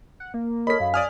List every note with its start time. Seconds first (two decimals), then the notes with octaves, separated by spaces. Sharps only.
0.20 F#5
0.34 A#3
0.67 A4 A#4 C#5 D#5 B5 B6
0.80 F#2 F5
0.94 D5 G#5 D#6 F6